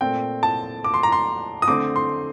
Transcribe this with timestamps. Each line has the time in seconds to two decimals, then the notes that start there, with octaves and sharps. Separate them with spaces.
0.01 A#2 A3 C4 G5
0.43 A5
0.84 D6
0.94 C6
1.03 A#5
1.12 C6
1.62 D#6
1.68 D3 A3 C4 D6
1.96 C6